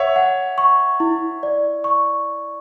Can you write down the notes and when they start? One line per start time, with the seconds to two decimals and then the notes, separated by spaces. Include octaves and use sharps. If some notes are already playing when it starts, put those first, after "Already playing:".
Already playing: C#5 E5 F#5
0.16 F#5
0.58 C#6
1.00 E4
1.43 D5
1.84 C#6